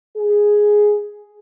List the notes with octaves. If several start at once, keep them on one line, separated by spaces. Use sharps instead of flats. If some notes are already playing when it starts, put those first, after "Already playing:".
G#4